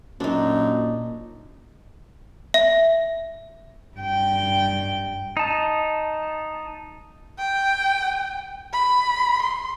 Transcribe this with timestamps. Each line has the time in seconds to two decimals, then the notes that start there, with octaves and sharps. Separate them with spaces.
0.20 F#2 A#2 D4 D#4
2.54 E5
3.97 G2 G5
5.37 D#4 A5
7.38 G5
8.73 B5
9.42 C6